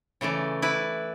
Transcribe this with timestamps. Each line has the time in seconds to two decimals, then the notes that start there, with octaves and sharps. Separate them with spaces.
0.21 C#3 E3 A3 D5
0.62 E4 B4 D5